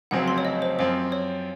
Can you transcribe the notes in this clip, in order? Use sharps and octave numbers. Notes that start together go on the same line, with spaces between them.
F1 F2 C#3 F#3 C4 F#5
C6
C#5
D#5
C5
F#2 F3 C4 C5
C#5